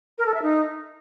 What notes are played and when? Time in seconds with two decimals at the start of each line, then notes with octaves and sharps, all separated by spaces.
0.18 A#4
0.26 A4
0.34 E5
0.42 D#4